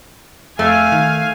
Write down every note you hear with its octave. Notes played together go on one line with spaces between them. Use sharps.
F2 A3 F5 G#5
D#3